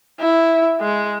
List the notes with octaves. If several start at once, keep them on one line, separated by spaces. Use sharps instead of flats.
E4
G#3